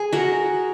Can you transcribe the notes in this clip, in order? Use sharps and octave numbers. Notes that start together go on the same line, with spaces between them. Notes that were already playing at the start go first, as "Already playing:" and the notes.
Already playing: G#4
F#4 A#4